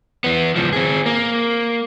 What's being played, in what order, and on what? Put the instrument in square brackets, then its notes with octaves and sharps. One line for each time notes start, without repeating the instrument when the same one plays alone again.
[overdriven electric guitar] E3 B3
C#2 F3
C4 G#4
A#3